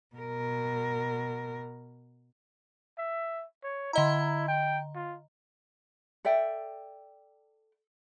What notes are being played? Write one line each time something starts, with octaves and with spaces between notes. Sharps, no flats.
B2 A#4
E5
C#5
D3 E4 D#5 A#5
G5
F4
A4 D5 E5 G5